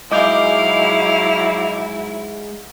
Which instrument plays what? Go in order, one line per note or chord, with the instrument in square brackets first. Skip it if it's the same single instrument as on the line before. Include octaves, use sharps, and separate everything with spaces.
[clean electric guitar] G#2 G#3 [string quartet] F#3 E4 [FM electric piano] D#5 D6 G6 [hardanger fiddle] F5